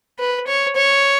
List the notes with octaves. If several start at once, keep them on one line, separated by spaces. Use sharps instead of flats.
B4
C#5
C#5